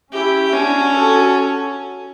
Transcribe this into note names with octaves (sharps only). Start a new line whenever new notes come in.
C#4 E4 G4
C#4 D4 F#4
F#4 A4